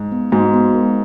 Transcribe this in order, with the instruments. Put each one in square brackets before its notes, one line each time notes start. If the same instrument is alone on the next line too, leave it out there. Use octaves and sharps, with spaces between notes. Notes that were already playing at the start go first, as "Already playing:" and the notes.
Already playing: [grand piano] G#2
[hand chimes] B3
[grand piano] G#2 [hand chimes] F#4
[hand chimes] B3
A#4